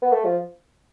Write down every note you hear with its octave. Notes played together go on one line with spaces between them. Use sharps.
B3
A3
F3